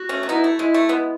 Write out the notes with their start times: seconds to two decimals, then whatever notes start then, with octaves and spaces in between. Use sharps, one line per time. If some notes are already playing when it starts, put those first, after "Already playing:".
Already playing: F#4
0.09 A3 C#4
0.23 C#4
0.29 B3 D#4 E4
0.44 A3
0.59 G#3 E4
0.74 A3
0.89 G#3 B3